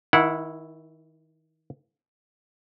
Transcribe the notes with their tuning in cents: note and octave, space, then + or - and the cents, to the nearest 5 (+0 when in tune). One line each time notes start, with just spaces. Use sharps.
D#3 +30 E4 +0 F#5 -20